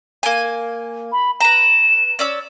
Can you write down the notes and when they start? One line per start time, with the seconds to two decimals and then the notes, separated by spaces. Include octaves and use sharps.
0.23 A#3 G#5
1.12 B5
1.40 B4 A#5 E7
2.19 C#4 D5 E6